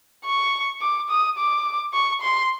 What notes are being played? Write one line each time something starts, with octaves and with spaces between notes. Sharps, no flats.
C#6
D6
D#6
D6
C#6
C6